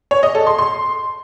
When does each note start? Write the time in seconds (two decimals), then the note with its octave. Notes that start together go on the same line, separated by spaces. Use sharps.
0.11 C#5
0.23 D#5
0.35 A4
0.47 C6
0.58 C6